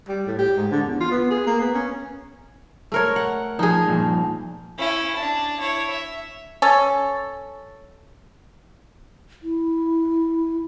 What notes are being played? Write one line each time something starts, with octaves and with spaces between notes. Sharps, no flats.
G3
A2
G4
G#2
D3
E2
F4
B3
G#4
A#3
B3
C#4
A3 A#4 C#5
F#5
F3 D#4 G#4
G2 A#2 F3
C#4 E4
D4 A5
E4 C#5
E5
C#4 A4
E4